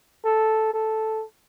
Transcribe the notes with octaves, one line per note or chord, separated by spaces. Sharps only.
A4
A4